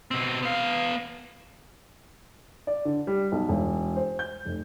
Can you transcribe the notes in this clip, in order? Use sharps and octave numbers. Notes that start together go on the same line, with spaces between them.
B2 C4
B3 F5
D5
D3
G3
B1
E1
C5
G6
F1